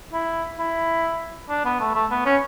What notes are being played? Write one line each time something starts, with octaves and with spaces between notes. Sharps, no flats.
E4
E4
D4
B3
A3
A3
B3
C#4